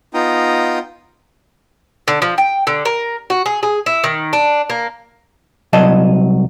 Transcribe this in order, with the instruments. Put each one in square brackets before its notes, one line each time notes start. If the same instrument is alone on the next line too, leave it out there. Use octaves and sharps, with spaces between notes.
[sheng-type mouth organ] B3 D#4 F4 G5 A#5 D#6
[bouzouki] D3
F3
G5
D3
A#4
F#4
G#4
G#4
E4
D#3
D4
A#3
[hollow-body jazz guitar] C2 F#3 D#5 A5